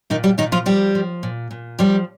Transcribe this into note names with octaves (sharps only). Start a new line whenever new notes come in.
A#2 D#3 D#4
G3 G4
A#2 D#3 D#4
F3 F4
F3 G3 G4
F3
A#2
A#2
F3 G3 G4